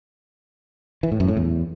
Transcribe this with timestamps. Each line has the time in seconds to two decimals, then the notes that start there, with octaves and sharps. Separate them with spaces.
1.03 E3
1.12 A2
1.20 F#2
1.28 A2
1.37 E2